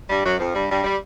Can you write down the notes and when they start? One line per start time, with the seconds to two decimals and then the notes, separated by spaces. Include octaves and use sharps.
0.09 G2 G3
0.24 F#2 F#3
0.39 F2 F3
0.54 G2 G3
0.69 G2 G3
0.84 G3